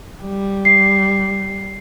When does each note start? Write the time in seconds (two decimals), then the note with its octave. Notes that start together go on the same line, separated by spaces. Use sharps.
0.22 G3
0.65 C7